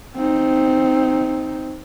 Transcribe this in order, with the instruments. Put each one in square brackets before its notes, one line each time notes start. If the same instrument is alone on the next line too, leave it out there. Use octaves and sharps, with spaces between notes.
[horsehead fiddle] C4 D#4